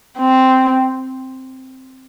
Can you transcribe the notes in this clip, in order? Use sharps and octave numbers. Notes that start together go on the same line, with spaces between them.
C4